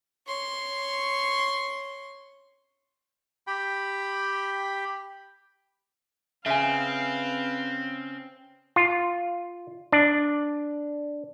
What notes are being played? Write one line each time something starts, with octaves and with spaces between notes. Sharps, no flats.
C#5 C6
G4 G5 B5
C#3 C4 B4 E5 F5 G#5 C6
F4
D4